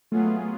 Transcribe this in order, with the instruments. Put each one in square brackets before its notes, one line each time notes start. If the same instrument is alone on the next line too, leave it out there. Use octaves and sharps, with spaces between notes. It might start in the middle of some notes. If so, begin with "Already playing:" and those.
[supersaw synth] F#3 B3 F4 G#4 [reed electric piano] A3